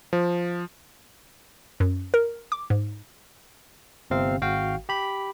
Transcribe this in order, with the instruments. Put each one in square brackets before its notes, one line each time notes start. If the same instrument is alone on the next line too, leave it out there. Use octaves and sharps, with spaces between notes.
[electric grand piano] F3
[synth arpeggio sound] F#2
A#4
D6
G#2
[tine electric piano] G1 C3 C4 F5
G#1 F#4 F5 G5
G4 B5